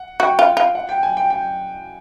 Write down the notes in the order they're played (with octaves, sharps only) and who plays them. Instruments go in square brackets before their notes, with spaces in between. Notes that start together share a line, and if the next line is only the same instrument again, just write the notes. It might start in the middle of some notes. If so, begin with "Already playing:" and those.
Already playing: [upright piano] F#5
[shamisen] F#4 [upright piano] G5
[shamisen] F4
F4
[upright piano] F#5
G5
G#5
G5
G5